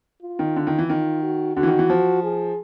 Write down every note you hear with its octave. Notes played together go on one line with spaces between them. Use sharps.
F4
D#3
D3
D#3
E3
D#3 F4
F#4
D3 F#4
E3
D#3
E3
F3
G#4